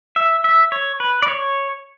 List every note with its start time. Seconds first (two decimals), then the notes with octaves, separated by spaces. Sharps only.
0.16 E5
0.44 E5
0.72 C#5
1.00 B4
1.22 D5
1.28 C#5